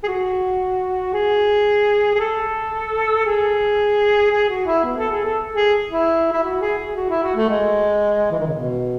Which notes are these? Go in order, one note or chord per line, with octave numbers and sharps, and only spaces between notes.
G#4
F#4
G#4
G#4
A4
G#4
G#4
F#4
E4
B3
A4
G#4
A4
G#4
E4
E4
F#4
G#4
G#4
F#4
E4
F#4
A3
G#3
E3
D#3
C#3
B2